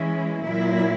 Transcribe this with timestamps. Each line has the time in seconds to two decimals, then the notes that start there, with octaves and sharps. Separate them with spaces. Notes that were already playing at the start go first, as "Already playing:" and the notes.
Already playing: E3 G#3 C#4 E4
0.43 A#2 F#3 A#3 E4